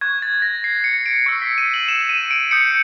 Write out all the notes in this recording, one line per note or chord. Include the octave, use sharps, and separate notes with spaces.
C#6 F#6 G#6
A6
A#6
C7
C#7
D7
C#6 E6 G6 C7
B6
D#7
F#7
E7
E7
D#7
D7
D#6 G6 C#7